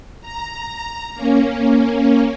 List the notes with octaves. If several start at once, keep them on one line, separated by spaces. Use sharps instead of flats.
A#5
A#3 C#4